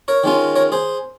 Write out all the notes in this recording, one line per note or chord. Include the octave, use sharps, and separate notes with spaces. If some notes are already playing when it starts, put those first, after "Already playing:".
A#4 C#5
D#3 G#3 C#4 F4
A#4 C#5
G#4 C5